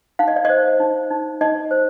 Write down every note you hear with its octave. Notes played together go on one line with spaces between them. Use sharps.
D#4 F5
D#5
D5
C5 D#5
D#4
D#4
D#4 D#5
C5